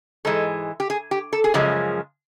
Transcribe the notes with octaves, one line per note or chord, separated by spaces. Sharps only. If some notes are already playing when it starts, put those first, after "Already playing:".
G#2 E3 G#3 A4
G4
G#4
G4
A4
G#4
F#2 C#3 F3 G#3 G4